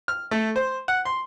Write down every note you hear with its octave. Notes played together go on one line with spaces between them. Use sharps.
F6
A3
C5
F#5
C6